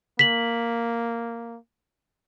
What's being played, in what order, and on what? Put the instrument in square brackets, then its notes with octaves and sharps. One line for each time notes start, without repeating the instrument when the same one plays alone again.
[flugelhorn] A#3 [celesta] B6 F#7